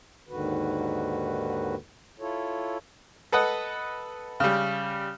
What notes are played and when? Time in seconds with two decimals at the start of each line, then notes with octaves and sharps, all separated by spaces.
0.29 D#2 G#2 D3 D#3 F#4 B4
2.20 E4 F4 A4 C#5
3.32 A4 B4 D#5 F#5
4.40 C#3 G3